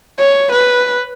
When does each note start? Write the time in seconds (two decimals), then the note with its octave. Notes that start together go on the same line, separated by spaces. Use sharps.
0.19 C#5
0.52 B4